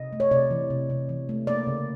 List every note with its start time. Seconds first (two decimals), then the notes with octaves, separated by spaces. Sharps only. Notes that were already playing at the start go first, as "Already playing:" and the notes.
Already playing: C3 D#5
0.13 A3
0.20 C#5
0.31 C3 D5
0.51 E3
0.70 C3
0.90 C3
1.09 E3
1.29 A3
1.47 A#3 D5
1.67 C#3